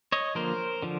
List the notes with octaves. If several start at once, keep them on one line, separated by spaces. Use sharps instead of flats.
C#5 D#5
D3 F3 A#3 A#4 C5
D3 F3